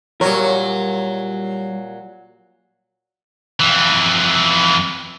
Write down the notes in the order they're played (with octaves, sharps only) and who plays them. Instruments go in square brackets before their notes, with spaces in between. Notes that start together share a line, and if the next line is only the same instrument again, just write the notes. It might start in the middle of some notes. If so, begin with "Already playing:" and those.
[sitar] A#2 F#3 C#5 [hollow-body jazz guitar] G3 A#4
[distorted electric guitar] F2 E3